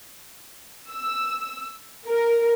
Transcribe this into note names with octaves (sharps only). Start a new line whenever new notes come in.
E6
A#4